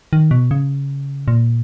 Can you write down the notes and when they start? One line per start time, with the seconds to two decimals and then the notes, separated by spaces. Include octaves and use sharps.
0.13 D#3
0.31 B2
0.51 C#3
1.28 A#2